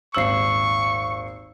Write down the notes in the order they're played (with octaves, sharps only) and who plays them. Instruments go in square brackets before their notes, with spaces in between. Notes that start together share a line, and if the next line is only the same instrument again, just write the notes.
[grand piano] D#1 G#1 F#7 [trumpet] C#6 [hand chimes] E6 C7